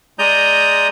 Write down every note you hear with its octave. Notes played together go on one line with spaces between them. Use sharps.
G#3 D5 A#5 D#6 G6